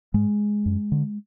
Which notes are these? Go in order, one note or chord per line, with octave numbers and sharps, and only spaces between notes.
G#2 G#3
F#2
D3